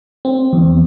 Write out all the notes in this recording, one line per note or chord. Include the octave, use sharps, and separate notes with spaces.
C4
E2